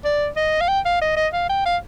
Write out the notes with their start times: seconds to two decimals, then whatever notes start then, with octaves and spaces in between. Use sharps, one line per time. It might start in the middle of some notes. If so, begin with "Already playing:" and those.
0.05 D5
0.37 D#5
0.61 F5
0.68 G5
0.86 F5
1.02 D#5
1.17 D#5
1.33 F5
1.50 G5
1.66 F5